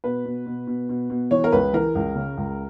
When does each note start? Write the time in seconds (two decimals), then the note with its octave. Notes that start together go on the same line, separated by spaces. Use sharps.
0.04 B2 B4
0.25 B2
0.46 B2
0.67 B2
0.89 B2
1.10 B2
1.31 E3 C#5
1.44 A#4
1.52 C#2 B4
1.73 E3 A#4
1.95 C#2
2.15 C#3
2.37 C#2